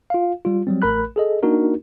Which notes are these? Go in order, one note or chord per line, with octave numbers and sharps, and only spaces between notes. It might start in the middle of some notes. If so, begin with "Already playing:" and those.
F4 F5
G3 F4
F#3 G3 C4
A1 A3 A#4 B5 F#6
G#4 A4 D#5
A#3 D4 D#4 F#4 A#4